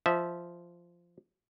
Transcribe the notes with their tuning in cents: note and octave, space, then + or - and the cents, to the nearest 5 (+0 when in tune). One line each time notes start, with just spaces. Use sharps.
F3 -10 E5 -20